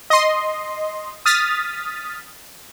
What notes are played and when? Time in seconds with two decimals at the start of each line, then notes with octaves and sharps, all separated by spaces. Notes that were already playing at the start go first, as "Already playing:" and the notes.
0.10 D#5 C6
1.26 D#6 F6 A6 B6